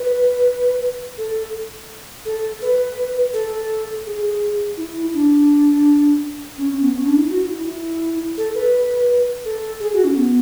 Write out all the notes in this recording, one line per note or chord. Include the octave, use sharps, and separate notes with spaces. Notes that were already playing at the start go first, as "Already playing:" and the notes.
Already playing: B4
A4
A4
B4
A4
G#4
E4
D4
C#4
C#4
B3
C#4
D4
E4
F#4
E4
E4
A4
B4
A4
G#4
F#4
C#4
B3